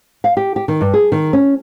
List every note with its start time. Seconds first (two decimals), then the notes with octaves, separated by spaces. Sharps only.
0.24 F5
0.37 G4
0.56 G4
0.68 D#3
0.81 G2
0.94 G#4
1.12 D#3
1.33 C#4